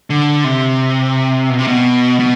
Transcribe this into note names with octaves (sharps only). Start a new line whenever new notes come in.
D3
C3
B2
C3
B2
B2